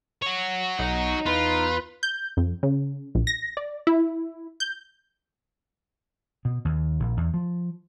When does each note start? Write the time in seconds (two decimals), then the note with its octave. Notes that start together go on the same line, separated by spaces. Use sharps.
0.22 F#4 C#5
0.79 B1 D#4
1.26 E2 F4 B4
2.03 G6
2.37 F2
2.63 C#3
3.15 A#1
3.27 A#6
3.57 D5
3.87 E4
4.60 G6
6.45 B2
6.65 D#2
7.00 A#1
7.17 E2
7.34 F3